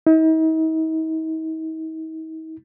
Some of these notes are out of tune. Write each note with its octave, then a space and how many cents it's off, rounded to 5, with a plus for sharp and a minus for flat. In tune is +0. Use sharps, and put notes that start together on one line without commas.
D#4 +45